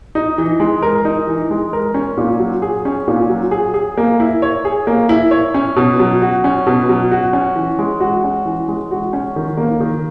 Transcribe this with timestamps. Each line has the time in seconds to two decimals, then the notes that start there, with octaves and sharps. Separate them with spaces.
0.15 D#4
0.38 E3
0.60 G#3
0.82 A#4
1.05 D#4
1.27 E3
1.50 G#3
1.73 A#4
1.94 C#4
2.17 A#2
2.39 F#3
2.62 G#4
2.85 C#4
3.08 A#2
3.29 F#3
3.51 G#4
3.74 G#4
3.97 A#3
4.20 E4
4.42 C#5
4.65 G#4
4.87 A#3
5.09 E4
5.31 C#5
5.54 C#4
5.76 B2
5.99 F#3
6.22 F#4
6.44 C#4
6.67 B2
6.89 F#3
7.11 F#4
7.33 C#4
7.56 E3
7.79 G#3
8.00 F#4
8.24 C#4
8.45 E3
8.68 G#3
8.91 F#4
9.13 C#4
9.36 D#3
9.57 A#3
9.81 D#3